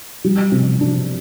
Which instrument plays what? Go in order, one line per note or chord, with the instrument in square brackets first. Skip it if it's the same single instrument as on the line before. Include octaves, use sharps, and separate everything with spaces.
[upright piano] G3
C3
D4